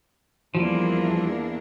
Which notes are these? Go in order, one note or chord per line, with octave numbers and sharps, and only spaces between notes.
E2 F3 G3 A#3 D4